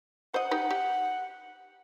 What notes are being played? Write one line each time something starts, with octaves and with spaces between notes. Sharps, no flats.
C5 D#5 F#5
D#4 G4 B4
G4